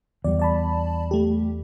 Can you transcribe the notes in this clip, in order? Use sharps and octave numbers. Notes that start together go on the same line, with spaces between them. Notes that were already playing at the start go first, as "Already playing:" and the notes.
E2 G3 D5
D5 A5 B5
A3 G4